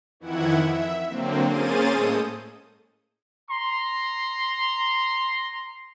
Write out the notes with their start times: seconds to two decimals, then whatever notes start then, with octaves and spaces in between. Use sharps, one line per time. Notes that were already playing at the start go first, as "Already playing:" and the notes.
0.20 F2 D#3 E3 E4 F#5 G#6
0.56 E5
1.07 D3 F#3 A#3 C4
1.45 A#3 C#4 G#4 C5 A6 D#7
1.91 A2 G#3 A4 D#6 G6
3.49 A#5 C6